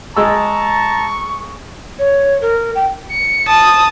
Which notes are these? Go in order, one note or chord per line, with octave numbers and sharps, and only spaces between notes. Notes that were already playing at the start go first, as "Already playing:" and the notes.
G#3 A5 A#5 C#6 E6
C#5
A#4
G5
C#7
A5 D#6